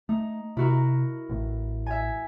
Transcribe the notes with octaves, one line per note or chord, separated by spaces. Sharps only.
A3 D#4
C3 E4 F#4 A#4
A1 A2
E5 G#5